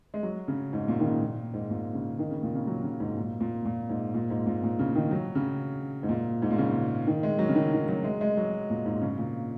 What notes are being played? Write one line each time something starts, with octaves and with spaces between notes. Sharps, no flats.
G#3
F#3
C#3
G#2
A#2
D#3
C#3
A#2
G#2
A#2
C#3
D#3
C#3
A#2
C#3
F#3
C#3
G#2
A#2
A#2
A#2
G#2
A#2
G#2
A#2
A#2
C#3
D#3
F#3
C#3
G#2
A#2
G#2
A#2
C#3
D#3
G#3
F#3
C#3
D#3
D#3
F#3
G#3
G#3
F#3
A#2
G#2
C#3
A#2